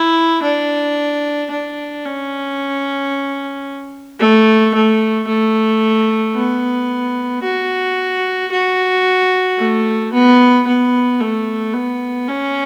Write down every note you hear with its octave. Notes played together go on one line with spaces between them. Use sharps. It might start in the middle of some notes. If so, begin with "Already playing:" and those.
Already playing: E4
D4
D4
C#4
A3
A3
A3
B3
F#4
F#4
A3
B3
B3
A3
B3
C#4